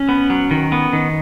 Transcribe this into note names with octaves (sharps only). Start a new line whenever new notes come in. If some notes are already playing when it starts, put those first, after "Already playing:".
Already playing: C#4
B3
F#3
D#3
B3
D#3